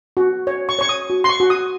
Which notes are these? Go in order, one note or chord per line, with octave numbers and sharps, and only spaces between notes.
F#4
C#5
C#6
C#5 C#6
D#6
F#4
C6
C#6
F#4
D#6